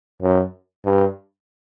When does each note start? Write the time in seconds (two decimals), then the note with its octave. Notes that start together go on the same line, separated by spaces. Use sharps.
0.22 F#2
0.85 G2